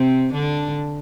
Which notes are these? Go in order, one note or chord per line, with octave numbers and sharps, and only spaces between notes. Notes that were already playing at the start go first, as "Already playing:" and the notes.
Already playing: C3 C4
D3 D4